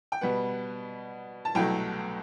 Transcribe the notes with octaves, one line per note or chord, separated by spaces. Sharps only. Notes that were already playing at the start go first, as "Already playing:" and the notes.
G5
B2 G3 B3 F#5
A5
C2 B2 F#3 A3 G5